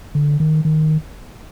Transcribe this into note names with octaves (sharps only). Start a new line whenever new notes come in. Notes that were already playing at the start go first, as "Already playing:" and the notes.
D3
D#3
D#3